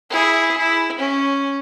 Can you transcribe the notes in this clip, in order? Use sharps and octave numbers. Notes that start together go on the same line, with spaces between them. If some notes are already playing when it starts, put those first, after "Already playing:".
E4 G#4
E4
C#4